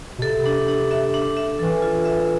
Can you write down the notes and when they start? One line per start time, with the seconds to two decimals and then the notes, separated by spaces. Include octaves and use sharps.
0.19 B2
0.22 C3 A4
0.46 D4
0.68 D4
0.91 E5
1.14 D4
1.37 E5
1.59 E3 A4
1.82 F4
2.05 E5